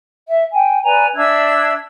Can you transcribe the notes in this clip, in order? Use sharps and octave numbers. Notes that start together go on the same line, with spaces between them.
E5
G5 G#5
B4 D5 G#5 A#5
D4 E5 E6 G#6